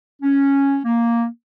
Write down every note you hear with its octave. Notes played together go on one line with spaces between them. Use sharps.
C#4
A#3